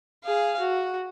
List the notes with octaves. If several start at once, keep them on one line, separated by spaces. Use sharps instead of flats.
G#4 F5
F#4